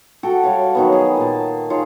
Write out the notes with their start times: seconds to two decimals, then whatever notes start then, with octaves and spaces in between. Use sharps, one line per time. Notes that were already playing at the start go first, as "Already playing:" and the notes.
0.23 F#4 A4 G5
0.43 G3 C#5 F5
0.75 D#3 F#3 B3
0.92 G#4
1.17 A#2 A5
1.70 D#4 F4 G#4 C#5